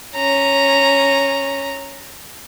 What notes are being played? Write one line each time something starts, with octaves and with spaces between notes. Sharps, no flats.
C#4 A#5